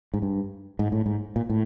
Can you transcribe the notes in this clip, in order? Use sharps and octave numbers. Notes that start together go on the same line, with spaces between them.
G#2
G2
G#2
A2
G#2
A#2
A2